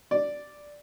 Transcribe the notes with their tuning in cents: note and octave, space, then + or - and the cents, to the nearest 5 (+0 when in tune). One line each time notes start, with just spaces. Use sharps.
D5 +0